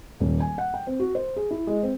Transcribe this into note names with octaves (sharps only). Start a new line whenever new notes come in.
D#1
G#5
F#5
G5
C4
F#4
C5
G#4
E4
G#3
C4